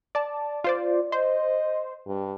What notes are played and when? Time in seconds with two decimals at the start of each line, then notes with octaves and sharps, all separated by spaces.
0.15 D5 A5
0.64 F4 C5 D5
1.12 C5 D#5
2.07 G2